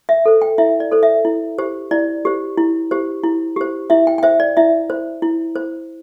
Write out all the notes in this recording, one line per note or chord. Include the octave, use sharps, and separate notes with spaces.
E5
A4 C5
G5
E4 E5
D5
A4 C5
E5
E4
G4 C5
E4 D5
G4 C5
E4
G4 C5
E4
G4 C5
E4 E5
G5
G5
C5 E5
D5
E4 E5
C5
E4
C5